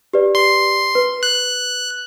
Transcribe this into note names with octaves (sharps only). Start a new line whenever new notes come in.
G4 B4 D5
C6
B4
F#6